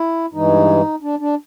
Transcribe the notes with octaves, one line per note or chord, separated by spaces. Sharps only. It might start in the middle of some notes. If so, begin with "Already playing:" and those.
Already playing: E4
G2 E3 G#3 D#4
D4
D4